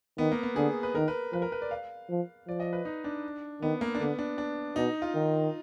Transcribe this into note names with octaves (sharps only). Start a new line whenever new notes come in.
D#3 B3
A#3
B3
D3 G#4
B4
D#3 A#4
B4
F3 B4
A#4
B4
D5
F5
F3
F3 D5
D#5
B4
D#4
D4
D#3 B3
A#3
D4
D3 B3
D4
D4
B2 D#4
F4
D#3